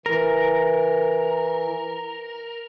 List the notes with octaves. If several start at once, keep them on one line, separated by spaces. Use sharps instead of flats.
E3 A#4